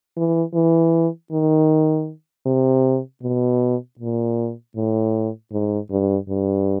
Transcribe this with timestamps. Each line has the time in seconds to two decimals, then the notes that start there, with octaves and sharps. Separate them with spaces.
0.17 E3
0.54 E3
1.32 D#3
2.46 C3
3.23 B2
3.99 A#2
4.76 A2
5.52 G#2
5.91 G2
6.28 G2